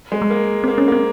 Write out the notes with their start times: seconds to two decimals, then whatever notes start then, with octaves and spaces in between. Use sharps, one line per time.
0.12 G#3
0.22 G#3
0.30 A#3
0.64 A#3 C4
0.78 C#4
0.88 A#3 C4